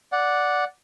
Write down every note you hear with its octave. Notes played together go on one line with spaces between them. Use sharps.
D5 F#5